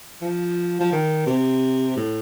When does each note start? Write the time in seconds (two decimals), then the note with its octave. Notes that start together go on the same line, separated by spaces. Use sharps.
0.22 F3
0.80 F3
0.92 D#3
1.26 C3
1.96 A2